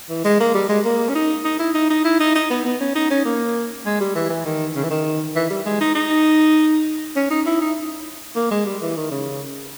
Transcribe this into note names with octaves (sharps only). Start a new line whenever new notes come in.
E3
G#3
A#3
G3
G#3
A#3
C#4
D#4
D#4
E4
D#4
D#4
E4
D#4
D#4
B3
B3
C#4
D#4
C#4
A#3
G#3
G3
E3
E3
D#3
C#3
E3
D#3
E3
G3
G#3
D#4
D#4
C#4
D#4
E4
D#4
A#3
G#3
G3
E3
D#3
C#3